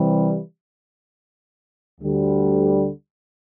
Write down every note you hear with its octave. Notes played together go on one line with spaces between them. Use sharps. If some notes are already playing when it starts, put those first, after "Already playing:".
Already playing: C3 E3 G3
D2 D3 G3